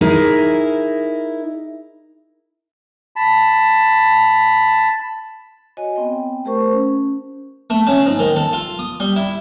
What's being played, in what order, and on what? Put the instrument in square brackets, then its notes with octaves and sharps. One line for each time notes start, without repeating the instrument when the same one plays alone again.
[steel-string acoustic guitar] D#4 E4 G#4 A#4
[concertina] A5 B5
[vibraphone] F#4 C#5 D#5 G#5
B3 C4 G5
A3 G4 A#4 C5 C#6
C#4
[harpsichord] A3
C#3
G#2
D#3
A4
F4
D#6
G3
E4